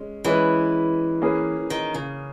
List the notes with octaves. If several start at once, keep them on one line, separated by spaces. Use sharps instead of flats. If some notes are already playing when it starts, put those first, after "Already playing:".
Already playing: G#3 C#4
E3 G#3 C#4 E4 B4
A#3 C#4 G#4 B4
D#3
C#3